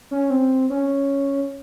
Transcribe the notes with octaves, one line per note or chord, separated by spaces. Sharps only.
C#4
C4
C#4